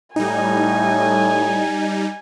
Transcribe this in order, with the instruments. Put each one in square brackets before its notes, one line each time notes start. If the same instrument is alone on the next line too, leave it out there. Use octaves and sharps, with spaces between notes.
[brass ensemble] A2 [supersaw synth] G3 D#4 [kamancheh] G#5